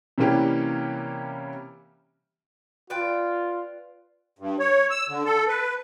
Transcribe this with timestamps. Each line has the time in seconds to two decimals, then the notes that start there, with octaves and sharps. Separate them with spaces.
0.18 C3 E3 G3 A#3 C#4 G4
2.90 F4 B4 D5 G5
4.39 G2
4.59 C#5
4.90 E6
5.09 D3
5.25 A4
5.48 B4